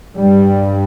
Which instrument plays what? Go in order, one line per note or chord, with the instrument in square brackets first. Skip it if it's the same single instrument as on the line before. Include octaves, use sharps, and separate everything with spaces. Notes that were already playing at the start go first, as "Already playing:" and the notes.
[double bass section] G2 G3